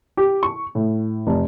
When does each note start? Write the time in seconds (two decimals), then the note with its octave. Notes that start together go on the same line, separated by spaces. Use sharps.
0.17 G4
0.43 C#6
0.75 A2
1.27 F1